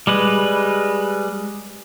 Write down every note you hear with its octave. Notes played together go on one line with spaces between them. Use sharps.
G3 G#3 B4